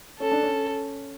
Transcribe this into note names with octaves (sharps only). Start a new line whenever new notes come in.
C#4 A4
D4
C#4